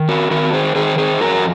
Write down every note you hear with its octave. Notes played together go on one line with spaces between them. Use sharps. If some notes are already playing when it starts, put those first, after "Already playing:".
Already playing: D#3
F#4 A#4
D#3 F#4 A#4
G#4 C5
D#3 G#4 C5
G#4 C5
F2 F#4 A#4